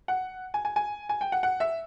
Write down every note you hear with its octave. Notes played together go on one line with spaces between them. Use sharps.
F#5
G#5
G#5
G#5
G#5
G5
F#5
F#5
E5